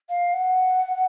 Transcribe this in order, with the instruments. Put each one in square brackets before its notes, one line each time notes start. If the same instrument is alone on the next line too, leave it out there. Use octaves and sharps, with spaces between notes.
[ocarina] F5
F#5